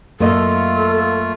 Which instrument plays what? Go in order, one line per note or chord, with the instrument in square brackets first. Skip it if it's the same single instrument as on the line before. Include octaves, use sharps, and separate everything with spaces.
[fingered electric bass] F#2 [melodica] A3 F4 [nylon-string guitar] A#3 D#5 [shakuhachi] A4